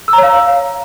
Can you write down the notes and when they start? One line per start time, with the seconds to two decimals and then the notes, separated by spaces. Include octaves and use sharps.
0.08 E6
0.13 A#5
0.18 C#5
0.23 F5